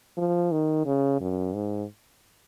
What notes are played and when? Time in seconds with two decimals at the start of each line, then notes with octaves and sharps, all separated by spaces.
0.17 F3
0.51 D#3
0.86 C#3
1.20 F#2
1.54 G#2